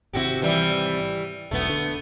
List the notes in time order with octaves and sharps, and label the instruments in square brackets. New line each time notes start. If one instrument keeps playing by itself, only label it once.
[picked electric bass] G#1 C3 [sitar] E4 F#4 G4
[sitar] E3 G3 E5
[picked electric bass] E1 B1 [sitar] A3 B3
[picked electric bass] D3